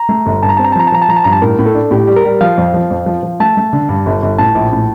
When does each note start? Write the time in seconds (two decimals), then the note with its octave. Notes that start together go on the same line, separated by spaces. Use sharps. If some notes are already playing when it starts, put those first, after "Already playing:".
Already playing: A#5
0.09 A3
0.26 G1
0.43 G2 A5
0.49 A#5
0.57 C4 A5
0.64 A#5
0.72 A5
0.76 F3 A#5
0.87 A5
0.92 F3 A#5
1.02 A5
1.09 F3 A#5
1.16 A5
1.24 G2 A#5
1.32 A5
1.42 A2 A#4
1.59 A2
1.66 A4
1.75 D4
1.91 A2 G4
2.07 G3
2.16 A#4
2.24 G3
2.41 F3 F5
2.58 F2
2.74 F3
2.91 F2
3.06 F3
3.23 F3
3.40 A3 A5
3.57 A3
3.73 D3
3.89 G2
4.06 G1
4.22 G1
4.38 A2 A5
4.55 A#1
4.73 A2